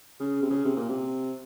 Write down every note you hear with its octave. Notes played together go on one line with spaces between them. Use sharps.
C#3
C3
C#3
C3
A#2
C3